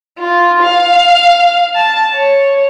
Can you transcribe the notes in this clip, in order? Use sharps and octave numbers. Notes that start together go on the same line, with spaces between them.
F4
F5
A5
C#5